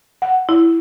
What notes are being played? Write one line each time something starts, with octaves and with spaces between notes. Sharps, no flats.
F#5
E4